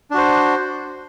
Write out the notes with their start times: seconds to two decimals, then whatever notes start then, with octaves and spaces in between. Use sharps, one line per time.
0.11 D4
0.14 F#4
0.18 C5